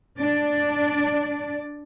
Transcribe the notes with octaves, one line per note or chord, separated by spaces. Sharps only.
D4 D5